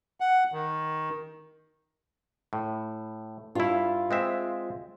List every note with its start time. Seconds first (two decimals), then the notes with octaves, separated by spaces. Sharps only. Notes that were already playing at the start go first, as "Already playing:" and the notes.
0.20 F#5
0.52 D#3
2.53 A2
3.55 G2 E4 F4
4.11 G#3 C4 E5